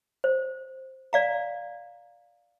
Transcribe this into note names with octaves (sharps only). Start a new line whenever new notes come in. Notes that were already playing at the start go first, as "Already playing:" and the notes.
C5
D5 F5 A#5